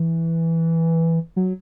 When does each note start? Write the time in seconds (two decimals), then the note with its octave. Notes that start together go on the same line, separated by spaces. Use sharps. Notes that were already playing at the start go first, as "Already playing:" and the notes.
Already playing: E3
1.36 F#3